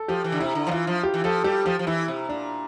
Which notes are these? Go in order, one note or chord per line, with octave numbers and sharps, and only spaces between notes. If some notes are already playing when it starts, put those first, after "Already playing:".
Already playing: A4
F3 G4
E3
D3
C3 E4
D3
F3
E3 F4
F3
G4
E3
F3 A4
G3 G4
F3 G4
F3
E3 E4
C3
A#2 D4